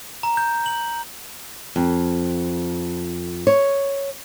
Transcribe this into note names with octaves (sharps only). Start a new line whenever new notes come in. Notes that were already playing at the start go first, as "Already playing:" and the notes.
A#5
G6
F#7
F2
C#5